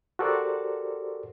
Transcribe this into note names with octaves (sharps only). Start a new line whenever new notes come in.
F#4 G4 A4 A#4 C5 D5